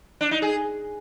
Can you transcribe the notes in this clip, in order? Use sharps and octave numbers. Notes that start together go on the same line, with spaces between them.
D4
D#4
G#4